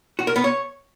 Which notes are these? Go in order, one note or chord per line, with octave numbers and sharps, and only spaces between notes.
F#4
A#4
B3
C#5